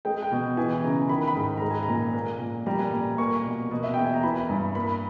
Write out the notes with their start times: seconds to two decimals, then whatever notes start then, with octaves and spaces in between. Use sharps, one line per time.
0.05 G#3 G5
0.22 G5
0.32 B2
0.57 E3 G#5
0.84 C#3 A#5
1.09 D#3 B5
1.28 B5
1.36 G#2
1.44 B5
1.57 G#3 A#5
1.71 G#5
1.83 A#5
1.89 A#2
2.14 A#3
2.40 A#2
2.66 G3 A#5
2.79 G#5
2.92 A#2 A#5
3.18 A#3 C#6
3.45 B2
3.71 B2
3.84 E5
3.94 E2 G5
4.04 G#5
4.14 A#5
4.23 E3 B5
4.49 G2
4.75 A#3 B5